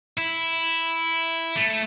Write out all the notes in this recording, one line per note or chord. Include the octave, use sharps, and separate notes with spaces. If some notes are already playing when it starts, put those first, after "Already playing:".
E4
A3